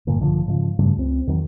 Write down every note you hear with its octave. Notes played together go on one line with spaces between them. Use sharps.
G#1 G2 A#2 D3
A#1 G2 D3 F3
G#2 C#3 F3
G2 C#3 G3 A3
C#2 C4
E2 D#3 F#3